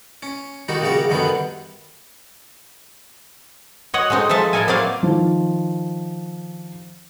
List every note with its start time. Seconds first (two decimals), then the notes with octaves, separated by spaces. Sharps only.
0.23 C#4
0.68 D#3 G3 D#4 F#4
0.81 A#1 C#3 G3 F#4 A#4
1.09 F#2 D3 D#3 G3 B3
3.94 F#4 C#5 D#5 F#5
4.10 G#3 A3 C4 D#4
4.29 F3 G#3 A4 E5 A5
4.53 A2 G#3 E4 A4 A#4 G#5
4.68 F#3 A#3 C4 F4 D5 F5
5.03 D#3 F3